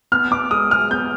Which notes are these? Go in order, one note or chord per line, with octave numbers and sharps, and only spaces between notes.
B3 F6
B3 D6
G#3 D#6
G#3 F6
B3 G6